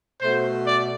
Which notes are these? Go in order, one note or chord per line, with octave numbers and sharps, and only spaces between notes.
B2 A3 C5
D5